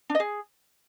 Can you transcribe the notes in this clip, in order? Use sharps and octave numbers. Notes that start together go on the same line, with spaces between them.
D4
D#5
G#4